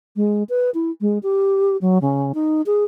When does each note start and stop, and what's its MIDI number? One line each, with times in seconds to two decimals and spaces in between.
0.16 0.43 56
0.49 0.70 71
0.74 0.91 64
1.01 1.18 56
1.23 1.77 67
1.81 1.98 54
2.02 2.32 49
2.34 2.62 63
2.66 2.84 68